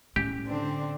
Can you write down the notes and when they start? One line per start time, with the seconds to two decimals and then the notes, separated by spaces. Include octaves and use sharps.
0.16 A2 C#4 G4
0.47 D3 C4 D4